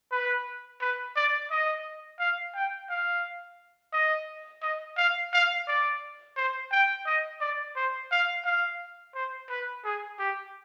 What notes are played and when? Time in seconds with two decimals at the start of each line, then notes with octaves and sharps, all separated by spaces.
0.12 B4
0.81 B4
1.16 D5
1.51 D#5
2.20 F5
2.55 G5
2.90 F5
3.93 D#5
4.63 D#5
4.97 F5
5.33 F5
5.68 D5
6.37 C5
6.72 G5
7.06 D#5
7.41 D5
7.76 C5
8.11 F5
8.45 F5
9.15 C5
9.50 B4
9.85 G#4
10.19 G4